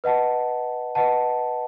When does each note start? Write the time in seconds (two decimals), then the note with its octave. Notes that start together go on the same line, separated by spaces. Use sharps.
0.04 B4 D#5 F#5 A5
0.95 B4 D#5 F#5 A5